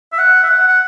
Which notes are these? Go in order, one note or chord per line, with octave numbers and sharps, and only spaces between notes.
E5
F#5
E5
F#5
F#5